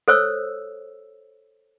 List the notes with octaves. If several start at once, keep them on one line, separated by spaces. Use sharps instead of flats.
A4 C5 C#5 E6